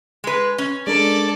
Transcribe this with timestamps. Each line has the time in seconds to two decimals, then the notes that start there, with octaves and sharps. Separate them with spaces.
0.24 G#3 B4
0.58 C#4
0.87 G#3 D4 A4 A#4 D5